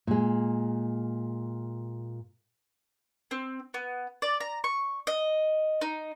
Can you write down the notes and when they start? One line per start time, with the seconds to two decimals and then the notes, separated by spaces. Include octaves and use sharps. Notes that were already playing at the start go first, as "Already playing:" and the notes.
0.07 A#2 G#3
3.31 C4
3.74 B3
4.22 D5
4.40 A#5
4.64 C#6
5.07 D#5
5.81 D#4